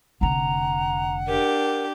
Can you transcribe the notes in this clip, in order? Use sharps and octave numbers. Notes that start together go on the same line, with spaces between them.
F1 D3 F#5 A#5
D4 G4 A#4